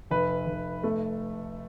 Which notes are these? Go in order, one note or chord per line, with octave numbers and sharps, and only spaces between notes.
F1 B4
F1
A3